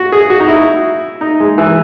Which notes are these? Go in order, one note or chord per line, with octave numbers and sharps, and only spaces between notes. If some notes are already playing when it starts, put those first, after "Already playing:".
Already playing: F#4
G#4
F#4
D#4
E4
D#4
G#3
E3